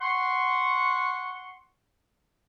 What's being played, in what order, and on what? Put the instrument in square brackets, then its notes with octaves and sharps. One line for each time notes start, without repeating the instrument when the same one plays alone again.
[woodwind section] F#5 C6 C#6